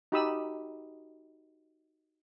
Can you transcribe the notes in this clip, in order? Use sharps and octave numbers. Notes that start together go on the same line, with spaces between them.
D#4 F#4 G4 B5 D#6 E6